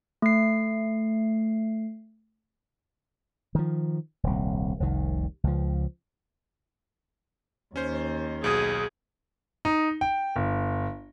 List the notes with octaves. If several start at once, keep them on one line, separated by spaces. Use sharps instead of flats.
A3 C7
D#3 F3
D#1 C2
F1 C2 D#3
C#2 F3
D#2 C#4 C5
B1 B2 G#4 D#6
D#4
G5
G1